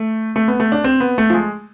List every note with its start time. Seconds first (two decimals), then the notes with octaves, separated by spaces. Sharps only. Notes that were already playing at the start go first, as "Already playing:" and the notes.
Already playing: A3
0.36 A3
0.48 B3
0.60 A3
0.72 D4
0.84 C4
1.00 B3
1.18 A3
1.30 F3
1.34 G#3